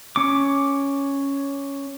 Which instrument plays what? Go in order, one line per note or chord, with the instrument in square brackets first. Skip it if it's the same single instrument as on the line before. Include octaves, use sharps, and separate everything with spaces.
[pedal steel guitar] C#4 D6